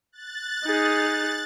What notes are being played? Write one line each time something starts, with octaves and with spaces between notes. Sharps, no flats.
F#6 A6
D#4 G#4